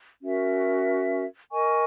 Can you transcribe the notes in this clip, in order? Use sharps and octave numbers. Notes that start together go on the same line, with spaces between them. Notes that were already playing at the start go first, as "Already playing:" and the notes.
C#4 F#4 A#4 E5
A#4 D#5 G#5 C#6